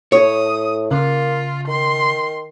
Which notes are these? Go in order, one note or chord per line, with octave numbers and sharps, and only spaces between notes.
A2 C#5 D#6
C#3 A#3 F4
D#3 C6